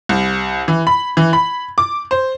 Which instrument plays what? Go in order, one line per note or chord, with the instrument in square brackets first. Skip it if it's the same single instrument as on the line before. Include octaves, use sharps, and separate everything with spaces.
[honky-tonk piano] C2
E3
B5
E3
B5
D6
C5